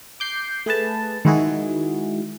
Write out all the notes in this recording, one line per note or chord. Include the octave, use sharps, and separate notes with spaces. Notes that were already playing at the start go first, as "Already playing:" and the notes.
D6 G6 C7
A3 G#4 B4 A5
D#3 G#3 E4 F#4 G#4